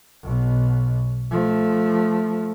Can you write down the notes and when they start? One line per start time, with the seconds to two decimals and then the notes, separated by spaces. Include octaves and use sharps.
0.23 B1 B2
1.31 F3 A3